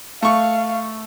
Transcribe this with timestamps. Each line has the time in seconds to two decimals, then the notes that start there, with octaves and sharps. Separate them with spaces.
0.22 A3 F5 C#6